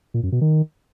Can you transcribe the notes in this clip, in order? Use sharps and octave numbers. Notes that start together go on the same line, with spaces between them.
A#2
F#2
B2
D#3